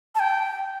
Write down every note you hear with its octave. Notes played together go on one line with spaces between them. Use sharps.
A5
G5